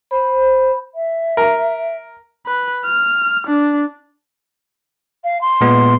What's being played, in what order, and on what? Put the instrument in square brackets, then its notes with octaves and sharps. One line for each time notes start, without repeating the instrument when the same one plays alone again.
[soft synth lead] C5 [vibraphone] B5
[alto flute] E5
[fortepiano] A#4
[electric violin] B4
F6
D4
[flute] F5
C6
[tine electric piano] A#2 G#3 B3